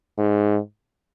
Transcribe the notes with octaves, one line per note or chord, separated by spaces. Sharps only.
G#2